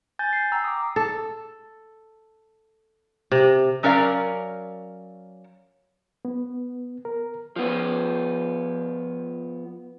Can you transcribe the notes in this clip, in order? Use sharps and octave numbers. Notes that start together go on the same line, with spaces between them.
G#5 G6 A6
C7
G5 A#5 E6
D6 D#6
A4
C3
F#3 C#4 A#4 D5 F5
B3
A#4
F3 B3